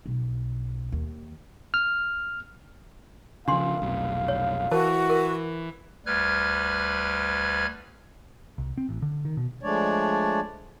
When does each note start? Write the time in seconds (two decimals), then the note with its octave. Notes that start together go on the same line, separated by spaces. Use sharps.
0.06 B1
0.92 D#2
1.74 F6
3.48 C#3 F3 D4 F5 C6
3.82 F1 B1
4.28 C#5
4.71 E3 F#4 A#4 C5 A5
5.09 A#4
6.06 D2 G3 B4 F6 G#6
8.58 C2
8.78 C4
8.89 A1
9.02 D3
9.25 D#3
9.37 B2
9.63 F3 G#3 A3 D4 C#5 D5